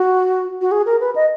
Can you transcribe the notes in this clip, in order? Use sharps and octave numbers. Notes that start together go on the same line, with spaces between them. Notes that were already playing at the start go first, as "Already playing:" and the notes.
Already playing: F#4
F#4
G#4
A#4
B4
D#5